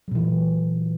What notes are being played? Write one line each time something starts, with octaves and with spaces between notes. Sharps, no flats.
A#2 E3 F#3